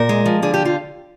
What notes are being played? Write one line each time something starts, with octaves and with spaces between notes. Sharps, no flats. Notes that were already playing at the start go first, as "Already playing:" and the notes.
Already playing: A#2 A#4
G#3
F3
D3 G#4
G4
F4